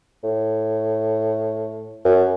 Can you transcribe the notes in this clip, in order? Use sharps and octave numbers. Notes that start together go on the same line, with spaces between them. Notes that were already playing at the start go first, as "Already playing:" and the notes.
A2
F#2